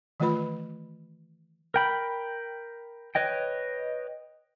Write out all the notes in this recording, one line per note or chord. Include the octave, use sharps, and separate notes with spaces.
D#3 E3 A3 F4 B4 B5
A#4 G5 B5
B4 C#5 D#5 G5